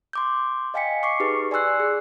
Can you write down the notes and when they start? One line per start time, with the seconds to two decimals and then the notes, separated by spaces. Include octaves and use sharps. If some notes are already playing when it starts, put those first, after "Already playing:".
0.13 C6 D6 G6
0.74 D#5 F5 G5 G#5 B6 C#7
1.03 C#6 D6 C7 C#7
1.20 D#4 G4 G#4 B4
1.51 D5 G#5 C6 E6 F#6 C7
1.80 G#4